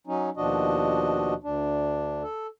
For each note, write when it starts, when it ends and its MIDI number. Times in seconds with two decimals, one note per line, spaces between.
0.07 0.30 54
0.07 0.30 61
0.07 0.30 63
0.37 1.34 39
0.37 1.34 47
0.37 1.34 53
0.37 1.34 62
0.37 1.34 66
0.37 1.34 75
1.43 2.23 38
1.43 2.23 62
2.23 2.47 69